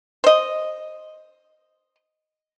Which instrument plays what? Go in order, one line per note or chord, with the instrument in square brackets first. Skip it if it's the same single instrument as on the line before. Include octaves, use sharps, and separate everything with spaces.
[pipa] C5 D#5